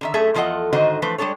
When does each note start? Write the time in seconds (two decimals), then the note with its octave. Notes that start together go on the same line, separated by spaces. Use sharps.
0.01 D3 D#3 E5
0.14 F#2 A3 G#4 A4 E5
0.34 E2 F3 F4 A4 D#5 F#5
0.73 G#2 D3 D#3 F#4 C5 D#5
1.02 E3 F3 A3 B4 C5
1.18 G3 G#3 D4 A4 C#5